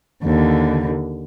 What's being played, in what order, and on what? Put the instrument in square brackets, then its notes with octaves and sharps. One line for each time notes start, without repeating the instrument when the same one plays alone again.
[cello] D#2 D3